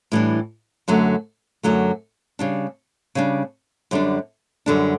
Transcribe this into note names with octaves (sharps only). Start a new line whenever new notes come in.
A2 E3 G3 D4
F#2 D3 F#3 A3
F#2 D3 F#3 A3
C#3 G3 D4
C#3 G3 D4
F#2 D3 G3 D4
F#2 D3 G3 D4